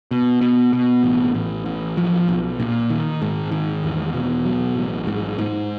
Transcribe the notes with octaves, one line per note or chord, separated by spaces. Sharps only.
B2
B2
B2
A1
A1
A1
F3
B1
A#2
D#3
G#2
D#3
E2
B2
F#3
A1
G#2
G#2